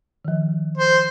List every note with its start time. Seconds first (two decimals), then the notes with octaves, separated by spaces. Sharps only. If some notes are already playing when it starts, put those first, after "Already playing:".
0.25 D#3 F3
0.78 C5